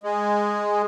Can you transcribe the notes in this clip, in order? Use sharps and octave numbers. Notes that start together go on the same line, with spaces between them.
G#3